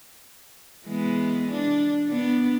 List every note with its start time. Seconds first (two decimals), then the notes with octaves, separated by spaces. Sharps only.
0.86 E3 G#3 B3
1.52 D4
2.08 B3 D4